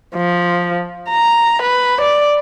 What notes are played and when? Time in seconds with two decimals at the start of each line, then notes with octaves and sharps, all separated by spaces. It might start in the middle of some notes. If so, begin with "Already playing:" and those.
0.15 F3
1.09 A#5
1.62 B4
2.01 D5